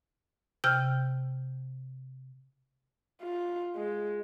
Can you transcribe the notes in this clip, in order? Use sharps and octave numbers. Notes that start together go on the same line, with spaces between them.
C3 G5 F6 G6
F4
G#3